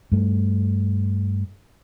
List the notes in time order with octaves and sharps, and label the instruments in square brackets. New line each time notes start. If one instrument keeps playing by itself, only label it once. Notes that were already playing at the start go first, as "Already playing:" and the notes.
[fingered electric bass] G2 A3